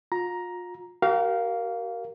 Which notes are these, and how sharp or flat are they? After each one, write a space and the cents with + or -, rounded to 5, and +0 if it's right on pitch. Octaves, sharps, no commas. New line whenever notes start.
F4 +35 A#5 +10
G4 -45 A#4 +0 F5 +0